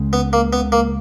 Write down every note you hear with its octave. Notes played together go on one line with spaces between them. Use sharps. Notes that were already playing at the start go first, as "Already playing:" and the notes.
Already playing: C#2 C#3 G#3
B3
A#3
B3
A#3